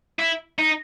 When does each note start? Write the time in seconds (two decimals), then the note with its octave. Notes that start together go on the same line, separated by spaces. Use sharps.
0.19 E4
0.59 D#4